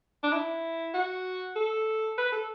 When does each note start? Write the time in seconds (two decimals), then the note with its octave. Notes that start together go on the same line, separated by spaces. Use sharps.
0.23 D4
0.33 E4
0.94 F#4
1.56 A4
2.18 B4
2.32 A4